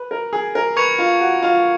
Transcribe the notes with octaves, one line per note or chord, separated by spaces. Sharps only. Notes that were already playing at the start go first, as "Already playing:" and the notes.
Already playing: B4
A#4
G#4
A#4
B4 C#6 G#6 C#7 F7
F4
F#4
F4